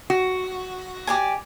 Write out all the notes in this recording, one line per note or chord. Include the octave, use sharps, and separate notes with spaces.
F#4
G4 D5 G#5